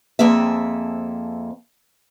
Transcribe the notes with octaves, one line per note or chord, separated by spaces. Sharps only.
F2 A#3 C4 G#4 A4 E5